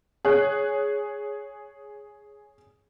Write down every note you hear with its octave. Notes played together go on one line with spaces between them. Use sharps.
G#4 C#5 F#6